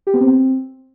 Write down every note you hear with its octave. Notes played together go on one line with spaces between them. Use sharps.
G4
B3
C4